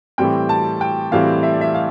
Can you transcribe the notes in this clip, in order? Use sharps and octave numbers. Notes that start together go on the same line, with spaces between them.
A2 E3 G3 C4 G5
A5
G5
A2 E3 G3 C4 F5
E5
D5
E5
F5